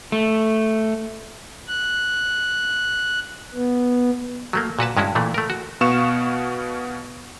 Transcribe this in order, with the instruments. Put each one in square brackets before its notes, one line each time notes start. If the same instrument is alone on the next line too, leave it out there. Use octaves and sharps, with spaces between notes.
[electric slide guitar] A3
[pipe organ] F#6
B3
[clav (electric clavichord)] F#3 A3 A#3
A#2 F#4 B4 A5
G2 G#3 C#4 E4 F#4
A#2 E3 A3
A3 A#4
F#4
[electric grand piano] B2 B3 F5 C#6 E7